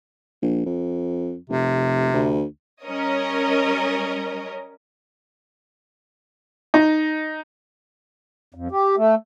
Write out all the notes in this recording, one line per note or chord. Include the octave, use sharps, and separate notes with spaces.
A#1
F2
F1 C3
D2
G3 C#4 A#4 C#5 D#5
D#4
F2
G4
A3